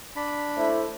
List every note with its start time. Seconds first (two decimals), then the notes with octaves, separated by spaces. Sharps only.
0.16 D4 B5
0.57 A3 E4 C5